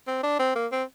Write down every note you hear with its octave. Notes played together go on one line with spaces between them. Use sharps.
C4
D4
C4
A#3
C4